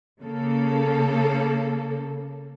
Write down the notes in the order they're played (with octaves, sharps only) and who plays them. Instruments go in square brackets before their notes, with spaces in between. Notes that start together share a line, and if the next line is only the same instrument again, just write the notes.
[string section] C#3 A#3 A4